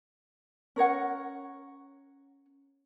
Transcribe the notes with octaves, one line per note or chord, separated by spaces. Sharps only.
C#4 A#4 C#5 F#5